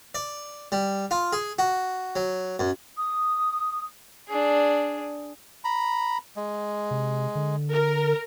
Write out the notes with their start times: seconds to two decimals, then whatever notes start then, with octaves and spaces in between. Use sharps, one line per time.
0.15 D5
0.72 G3
1.11 F4
1.33 G#4
1.59 F#4
2.16 F#3
2.59 F#2
2.96 D#6
4.28 D4 G#4
5.64 A#5 B5
6.36 G#3
6.91 C3
7.35 D3
7.72 A#4